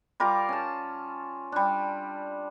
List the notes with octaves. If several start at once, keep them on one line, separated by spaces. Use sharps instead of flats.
G3 F4 A#4 D6
C#4 A5
G3 D4